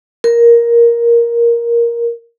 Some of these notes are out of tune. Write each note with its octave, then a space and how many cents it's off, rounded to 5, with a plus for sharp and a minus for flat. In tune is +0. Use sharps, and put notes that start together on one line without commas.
A#4 +10